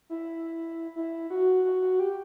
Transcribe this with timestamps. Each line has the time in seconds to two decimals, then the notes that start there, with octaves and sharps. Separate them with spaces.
0.10 E4
0.96 E4
1.30 F#4
1.65 F#4
1.82 F#4
2.00 G4